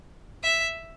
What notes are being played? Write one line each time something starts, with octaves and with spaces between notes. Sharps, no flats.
E5